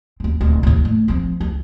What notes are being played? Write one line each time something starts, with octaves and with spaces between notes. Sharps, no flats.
D#2 C4
D1 C4
D#2 A2
A3
F3 C4
C#2